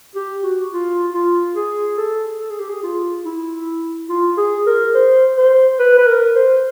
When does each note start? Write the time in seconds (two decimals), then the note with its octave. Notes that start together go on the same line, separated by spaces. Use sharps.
0.15 G4
0.44 F#4
0.72 F4
1.13 F4
1.56 G#4
1.98 A4
2.40 A4
2.50 G#4
2.59 G4
2.69 G#4
2.83 F4
3.25 E4
4.09 F4
4.37 G#4
4.67 A#4
4.95 C5
5.37 C5
5.79 B4
5.98 B4
6.07 A#4
6.35 C5